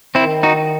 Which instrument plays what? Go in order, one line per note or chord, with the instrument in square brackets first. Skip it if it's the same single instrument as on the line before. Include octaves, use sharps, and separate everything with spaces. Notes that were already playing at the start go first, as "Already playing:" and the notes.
[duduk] D#3 [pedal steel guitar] C4 E4
[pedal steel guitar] D#4 F#4